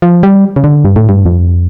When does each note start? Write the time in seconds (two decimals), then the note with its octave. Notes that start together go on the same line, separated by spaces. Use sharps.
0.02 F3
0.23 G3
0.56 C#3
0.64 D3
0.84 G2
0.96 A2
1.09 G2
1.25 F2